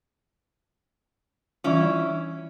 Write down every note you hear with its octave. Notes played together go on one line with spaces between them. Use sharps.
E3 G3 C#4 E4 F4